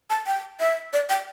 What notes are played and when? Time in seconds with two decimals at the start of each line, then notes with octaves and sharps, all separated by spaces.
0.10 A5
0.26 G5
0.60 E5
0.93 D5
1.09 G5